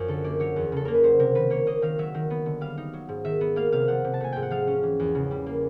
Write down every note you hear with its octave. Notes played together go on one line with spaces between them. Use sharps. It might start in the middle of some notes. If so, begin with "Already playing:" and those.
Already playing: F#2 F3
D3 A4
A#3 D5
F#3 C#5
E2
C#3 A4
A#3 A#4
B4
F#3 C5
C3 A#4
D#3 B4
A#3 C#5
A#3 D#5
D#3 F5
F#3 E5
D#3
B3
D3
G3 F5
D#4
F#3
G#2
D#3 E5
B3
A#3 F5
C3 F5
F3 F#5
C3
A5
A3 G#5
G#2 G5
F#5
F3 F5
C#4
E3
E2
C#3
G3
A#3